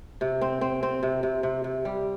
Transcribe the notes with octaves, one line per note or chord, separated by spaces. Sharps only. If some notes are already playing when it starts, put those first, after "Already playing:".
C3
C4
C4
C4
C3
C3
C3
C3
G3